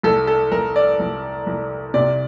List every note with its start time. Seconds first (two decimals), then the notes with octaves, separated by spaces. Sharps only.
0.03 C2 A4
0.27 A4
0.51 C2 A#4
0.76 D5
0.99 C2
1.46 C2
1.94 C3 D5